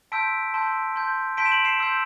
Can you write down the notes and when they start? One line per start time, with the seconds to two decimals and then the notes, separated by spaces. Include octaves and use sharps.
0.12 A5 C6 E6 G6 B6 D7
0.54 A5 C6 E6 G6
0.95 A5 C6 G6
1.37 A5 C6 G6 B6 D7
1.46 E7
1.52 D7 F#7
1.65 C7 E7
1.79 C6 E6 G6